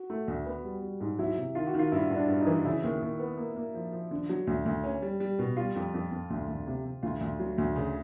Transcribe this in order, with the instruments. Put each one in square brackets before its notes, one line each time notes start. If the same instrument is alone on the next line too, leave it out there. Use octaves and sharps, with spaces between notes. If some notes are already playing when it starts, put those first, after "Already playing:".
Already playing: [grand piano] F#4
[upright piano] A3
D2
B3
G3
G3
G#2
[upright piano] F#3 [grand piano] E4
[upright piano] C3
[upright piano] D#3 [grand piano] F4
[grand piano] F#4
[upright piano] D#3
[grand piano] F4
[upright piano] G2 [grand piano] E4
[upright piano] G2
[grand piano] D4
[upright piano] G2
[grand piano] D#4
[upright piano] E3
[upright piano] C#3 [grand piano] E4
[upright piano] D#2
D#2
B3
A#3
A#3
F3
F3
D3
F#3
D2
D2
C#4
G3
G3
B2
[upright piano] G3 [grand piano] F4
[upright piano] F2
F2
F2
D2
D2
C3
C3
[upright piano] D2 [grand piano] F4
[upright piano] D2
F#3
D2
C#3